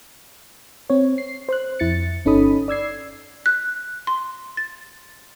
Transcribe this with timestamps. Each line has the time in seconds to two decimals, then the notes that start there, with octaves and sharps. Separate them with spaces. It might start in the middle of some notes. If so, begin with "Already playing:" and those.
0.90 C4 C#5
1.18 C7
1.49 C5 C6 F#6
1.79 F2 E4 A6 C#7
2.25 G1 C#4 D#4 A4 B5 D#6
2.68 D5 E6 G#6 C7
3.46 F#6
4.07 C6
4.57 A6